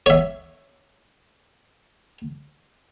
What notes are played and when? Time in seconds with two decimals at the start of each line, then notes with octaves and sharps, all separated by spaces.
0.06 C#5 E5